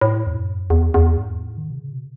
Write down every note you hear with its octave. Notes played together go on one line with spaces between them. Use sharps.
A2
E2
F#2
E2
E2
G#2
A2
D#3
B2
C#3
B2